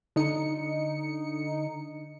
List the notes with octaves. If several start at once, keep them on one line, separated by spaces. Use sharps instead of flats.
D3 D#4 C#7